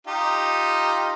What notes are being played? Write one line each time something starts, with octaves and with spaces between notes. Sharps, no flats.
D#4 F4 G4